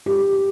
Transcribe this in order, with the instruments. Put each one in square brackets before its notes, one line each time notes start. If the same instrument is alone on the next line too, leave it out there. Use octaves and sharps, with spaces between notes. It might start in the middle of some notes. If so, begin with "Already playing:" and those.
[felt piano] G4